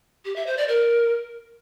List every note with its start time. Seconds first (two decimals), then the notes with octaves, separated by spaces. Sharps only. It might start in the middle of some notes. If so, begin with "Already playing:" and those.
0.25 G4
0.36 E5
0.47 C5
0.57 D5
0.68 A#4